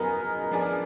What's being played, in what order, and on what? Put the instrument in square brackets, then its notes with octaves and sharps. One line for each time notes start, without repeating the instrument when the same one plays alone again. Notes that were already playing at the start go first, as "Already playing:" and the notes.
Already playing: [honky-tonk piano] F#3 B3 D#4 G#4 [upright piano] A#4 A#5
[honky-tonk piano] F3 B3 D4 G#4